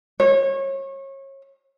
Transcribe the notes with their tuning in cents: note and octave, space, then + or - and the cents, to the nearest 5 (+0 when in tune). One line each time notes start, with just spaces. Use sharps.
C#5 -30